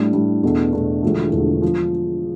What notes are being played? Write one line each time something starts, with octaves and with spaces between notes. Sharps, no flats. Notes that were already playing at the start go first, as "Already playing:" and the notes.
Already playing: A2 G3 D4
A2 G3 D4
E2 B2 A3 D4
E2 B2 A3 D4
E1 E2 D3 F3 A3
E1 E2 D3 F3 A3
F3